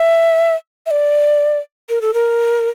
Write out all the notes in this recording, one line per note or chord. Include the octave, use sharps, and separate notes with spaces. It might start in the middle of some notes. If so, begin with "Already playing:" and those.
Already playing: E5
E5
D5
A#4
A4
A#4